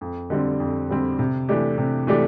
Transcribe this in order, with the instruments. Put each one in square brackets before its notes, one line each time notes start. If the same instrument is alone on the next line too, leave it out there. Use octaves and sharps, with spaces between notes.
[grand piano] F2
D3 G3 C4
F2
D3 G3 C4
C3
E3 A3 D4 G4
C3
E3 A3 D4 G4